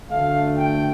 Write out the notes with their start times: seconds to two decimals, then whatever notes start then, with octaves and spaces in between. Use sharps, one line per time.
0.10 D2 D3 A3 F5
0.58 G5